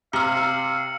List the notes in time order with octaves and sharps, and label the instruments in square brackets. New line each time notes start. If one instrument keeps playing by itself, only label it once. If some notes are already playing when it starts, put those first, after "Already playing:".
[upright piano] C3 [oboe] F5 [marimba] A#5 F6 [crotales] E6 C#7